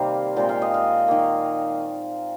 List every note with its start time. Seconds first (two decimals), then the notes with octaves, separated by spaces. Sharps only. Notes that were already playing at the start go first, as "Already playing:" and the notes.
Already playing: C3 D#3 G3 A#3 C4 F5
0.36 A#2 G#3 C4 G5
0.49 F5
0.62 D#5
0.74 F5
1.08 D#3 A#3